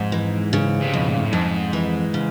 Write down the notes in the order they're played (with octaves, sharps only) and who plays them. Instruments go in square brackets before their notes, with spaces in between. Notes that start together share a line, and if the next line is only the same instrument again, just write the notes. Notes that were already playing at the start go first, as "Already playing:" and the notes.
Already playing: [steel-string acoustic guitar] F2 [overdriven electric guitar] G#2
[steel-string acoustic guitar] E3
C#3
[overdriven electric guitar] C3
[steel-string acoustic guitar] F2 [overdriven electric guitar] B2
[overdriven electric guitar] A#2
A2
[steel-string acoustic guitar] F2 [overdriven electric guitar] G#2
[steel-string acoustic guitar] E3
C#3